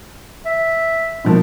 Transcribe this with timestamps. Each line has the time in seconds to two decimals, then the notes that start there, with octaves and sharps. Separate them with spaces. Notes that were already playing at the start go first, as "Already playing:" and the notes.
0.46 E5
1.25 B2 F3 A#3